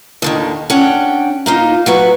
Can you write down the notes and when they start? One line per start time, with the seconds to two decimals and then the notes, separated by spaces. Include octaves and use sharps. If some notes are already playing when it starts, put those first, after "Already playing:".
0.22 D#2 D3 D#3
0.70 C#4 D4 F#5 G5
1.46 A#3 D#4 F4
1.86 F#3 F#4 B4